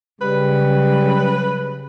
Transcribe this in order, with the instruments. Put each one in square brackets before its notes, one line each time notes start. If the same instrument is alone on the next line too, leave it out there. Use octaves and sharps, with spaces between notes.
[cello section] C#3 F#3 [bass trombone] G3 [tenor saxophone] B4